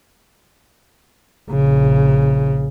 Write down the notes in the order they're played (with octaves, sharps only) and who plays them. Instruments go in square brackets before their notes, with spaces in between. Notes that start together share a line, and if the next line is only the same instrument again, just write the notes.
[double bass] A#1 C#3